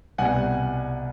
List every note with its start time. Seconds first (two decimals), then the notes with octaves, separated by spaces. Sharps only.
0.18 C2 B2 G3 F#5 G#5